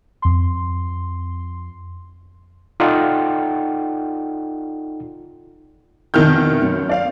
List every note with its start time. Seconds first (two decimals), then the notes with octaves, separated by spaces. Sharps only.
0.22 F2 C6
2.80 D#4 F4 A4 D5 F#5 G5
6.14 F1 B2 D#3 E4 F6 G6
6.62 F#2
6.89 D5 F5